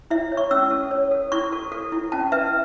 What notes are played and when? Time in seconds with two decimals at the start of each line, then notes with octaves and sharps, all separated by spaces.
0.11 E4 E5
0.32 C#5
0.37 C#6
0.51 C#4 E6
0.71 A4
0.91 C#5
1.11 A4
1.32 E4 C#6
1.52 A4
1.72 A4
1.92 E4
2.12 C#4 A5
2.32 B4 E5